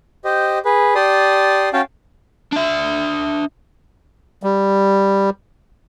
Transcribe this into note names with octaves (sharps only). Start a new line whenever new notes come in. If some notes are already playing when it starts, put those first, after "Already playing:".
G4 C5 D#5
G#4 B4
G4 D5 A5 C6 D#6
C#4 F#4 F5 G5 A5
D4 E5
G3